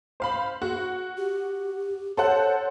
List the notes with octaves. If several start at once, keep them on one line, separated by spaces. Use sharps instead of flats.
C5 F5 B5
F#4
G4
A4 C5 C#5 F#5